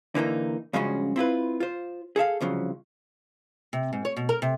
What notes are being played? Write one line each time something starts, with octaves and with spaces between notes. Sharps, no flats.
D3 E3 A#3 D#4
G2 C#3 F3 G#3 C#4 F#4
C4 E4 F4 B4
F4 C5
G#4 A4 E5 F5
C2 C#3 F3 F#3
C3
G#2
C#5
B2
A#4
C3